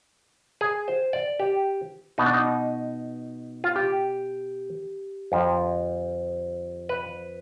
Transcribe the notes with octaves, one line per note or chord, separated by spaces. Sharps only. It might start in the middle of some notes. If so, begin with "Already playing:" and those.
G#4
C5
D5
G4
B2 B3 D#4
D4
D#4
F4
G4
F2 D3 F3
B4